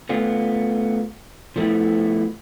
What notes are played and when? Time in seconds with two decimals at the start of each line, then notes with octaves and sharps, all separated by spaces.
0.09 A3 B3 F4
1.56 F3 A3 B3 E4